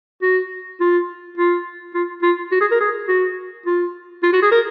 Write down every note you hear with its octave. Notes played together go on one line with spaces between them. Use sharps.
F#4
F4
F4
F4
F4
F#4
G#4
A#4
G#4
F#4
F4
F4
F#4
G#4
A#4